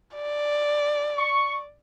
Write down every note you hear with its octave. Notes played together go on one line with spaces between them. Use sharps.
D5
C#6